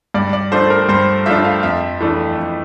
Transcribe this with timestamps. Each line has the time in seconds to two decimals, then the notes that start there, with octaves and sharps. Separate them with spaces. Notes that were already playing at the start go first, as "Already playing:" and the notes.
0.14 G2 D5
0.33 D5
0.52 F3 A3 D4 C5
0.70 A#4
0.89 G2 C5
1.26 F3 A3 D4 E5
1.44 F5
1.63 F2 E5
2.00 E3 A3 D4
2.37 F2